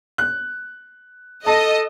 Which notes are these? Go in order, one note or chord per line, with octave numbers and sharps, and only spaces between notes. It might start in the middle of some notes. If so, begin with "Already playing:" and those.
F#6
A4 D#5 A5